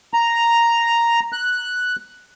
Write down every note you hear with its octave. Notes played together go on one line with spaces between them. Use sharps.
A#5
F#6